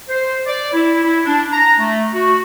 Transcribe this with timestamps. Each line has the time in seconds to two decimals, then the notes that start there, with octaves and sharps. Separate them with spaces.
0.09 C5
0.46 D5
0.73 E4
1.04 E4
1.26 D4
1.52 A#5
1.79 A3
2.13 F#4